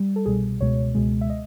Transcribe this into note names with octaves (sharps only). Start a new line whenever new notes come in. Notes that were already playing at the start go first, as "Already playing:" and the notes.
Already playing: G3
A4
C2 B2 G3 G#4
C#2 B2 G#3 C#5
C#2 B2 G#3
E5
D#5